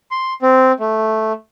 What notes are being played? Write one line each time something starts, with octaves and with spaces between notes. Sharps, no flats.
C6
C4
A3